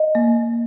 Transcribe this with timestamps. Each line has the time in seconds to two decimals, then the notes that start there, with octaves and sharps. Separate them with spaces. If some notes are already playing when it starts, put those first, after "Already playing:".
Already playing: D#5
0.15 A#3